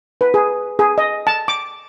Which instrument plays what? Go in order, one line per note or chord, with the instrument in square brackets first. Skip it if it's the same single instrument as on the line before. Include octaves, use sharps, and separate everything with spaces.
[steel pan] B4
G#4
G#4
D#5
A5
D6